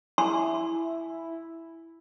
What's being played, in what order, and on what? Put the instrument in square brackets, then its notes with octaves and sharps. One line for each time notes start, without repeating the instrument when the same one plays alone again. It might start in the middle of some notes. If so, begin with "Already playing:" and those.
[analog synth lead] E4 [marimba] G#5 [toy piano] C6